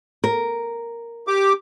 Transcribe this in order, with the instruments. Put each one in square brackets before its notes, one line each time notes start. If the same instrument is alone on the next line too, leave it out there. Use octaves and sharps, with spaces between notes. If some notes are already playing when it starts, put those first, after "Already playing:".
[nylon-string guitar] A#4
[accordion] G4 D6